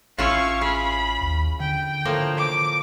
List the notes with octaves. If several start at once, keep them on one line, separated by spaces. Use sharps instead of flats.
A1 C#4 E4 F4 F5 C#6
G#4 B5
D#2
D3 G5
A2 F3 A#3
D6